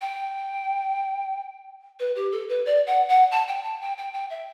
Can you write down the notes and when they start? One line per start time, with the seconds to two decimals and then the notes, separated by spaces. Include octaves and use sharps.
0.01 G5
1.99 B4
2.15 G4
2.32 A4
2.49 B4
2.66 D5
2.86 F#5
3.08 F#5
3.31 A5
3.48 G5
3.64 A5
3.81 G5
3.98 G5
4.13 G5
4.30 E5